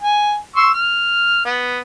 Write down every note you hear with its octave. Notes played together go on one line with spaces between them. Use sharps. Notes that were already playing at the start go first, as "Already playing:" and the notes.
G#5
C6 C#6 E6
F6
B3